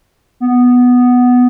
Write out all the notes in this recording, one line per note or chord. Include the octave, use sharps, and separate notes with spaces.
B3